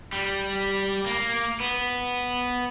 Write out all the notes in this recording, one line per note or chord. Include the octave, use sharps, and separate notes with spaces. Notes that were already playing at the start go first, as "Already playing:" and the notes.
G3
A#3
B3